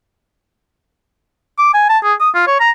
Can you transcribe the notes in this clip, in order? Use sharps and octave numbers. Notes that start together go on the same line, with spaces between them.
D6
G#5
A5
G#4
D#6
F4
C#5
A#5